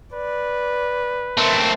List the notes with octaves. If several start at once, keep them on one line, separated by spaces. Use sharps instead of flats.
B4 D5
A3 C4 A#4 C5 E5